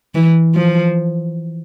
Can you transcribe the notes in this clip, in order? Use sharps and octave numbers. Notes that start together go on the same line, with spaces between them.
E3
F3